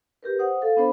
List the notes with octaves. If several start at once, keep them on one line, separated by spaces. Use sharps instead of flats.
G4 A#4 B4
C5 F#5 D#6
A4 F5
B3 D4 C5 B5